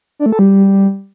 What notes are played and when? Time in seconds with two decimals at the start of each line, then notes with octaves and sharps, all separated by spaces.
0.19 D4
0.26 A3
0.32 A4
0.39 G3